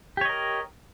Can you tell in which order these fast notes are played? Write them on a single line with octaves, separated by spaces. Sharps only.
G4 C#5 D#5 A#4